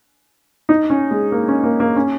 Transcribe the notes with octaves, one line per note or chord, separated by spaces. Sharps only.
D#4
C#4
G#3
A#3
C#4
A#3
A#3
C#4